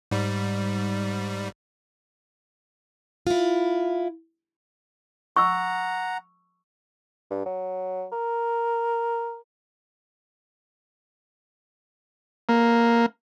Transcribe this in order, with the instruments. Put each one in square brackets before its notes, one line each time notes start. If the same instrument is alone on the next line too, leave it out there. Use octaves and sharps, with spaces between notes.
[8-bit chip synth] G#2 G3
[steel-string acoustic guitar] E4 F4
[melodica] F#5 A#5 [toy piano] C#6 E6
[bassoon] G2
F#3
A#4
[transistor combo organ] A#3